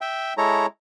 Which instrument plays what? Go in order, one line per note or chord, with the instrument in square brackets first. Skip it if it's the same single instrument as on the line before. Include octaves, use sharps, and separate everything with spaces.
[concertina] E5 G5
G#3 E4 A4 C#5 A#5